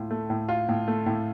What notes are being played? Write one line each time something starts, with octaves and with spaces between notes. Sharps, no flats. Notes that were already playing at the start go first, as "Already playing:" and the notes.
Already playing: A2 F4
A3
A2
F4
A2
A3
A2